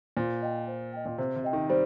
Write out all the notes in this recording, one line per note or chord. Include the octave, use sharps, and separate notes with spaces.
A#2 C5
D#5 G5
C5
D#5 G5
A#2
C3 C5
C3
D#5 G5
D#3
G3 C5